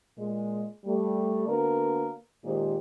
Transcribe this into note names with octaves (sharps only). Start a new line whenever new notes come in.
A#2 G#3
G3 A3
D3 A#3 B3 F#4 A#4
A#2 D#3 G#3 G4 G#4 C5